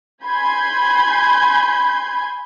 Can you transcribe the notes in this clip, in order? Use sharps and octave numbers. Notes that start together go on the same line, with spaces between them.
G#5 B5 C6 G6 G#6